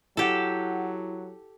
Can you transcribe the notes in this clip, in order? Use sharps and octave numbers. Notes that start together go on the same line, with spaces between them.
F#3 E4 G4 A4 F#5